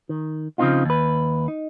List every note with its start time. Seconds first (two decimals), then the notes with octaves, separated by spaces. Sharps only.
0.09 D#3
0.58 C#3 F3 F#3 C4 D#4 F4
0.85 D#2 B4
1.48 D#4